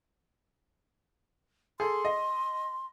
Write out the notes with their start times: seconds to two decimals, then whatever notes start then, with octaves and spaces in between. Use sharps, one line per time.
1.80 G#4 A4 C6
2.05 D#5